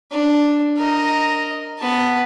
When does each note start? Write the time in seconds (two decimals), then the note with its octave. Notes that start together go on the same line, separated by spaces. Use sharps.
0.11 D4
0.77 A#4 D#5
1.79 B3 A5